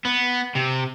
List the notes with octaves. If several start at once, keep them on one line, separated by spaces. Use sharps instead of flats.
B3
C3